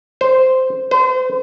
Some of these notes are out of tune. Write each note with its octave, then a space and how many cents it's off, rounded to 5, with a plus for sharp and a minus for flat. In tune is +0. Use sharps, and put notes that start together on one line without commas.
C5 -10
C5 -40